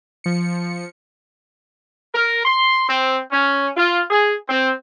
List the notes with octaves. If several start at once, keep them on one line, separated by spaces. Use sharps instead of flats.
F3 C#7
A#4
C6
C4
C#4
F4
G#4
C4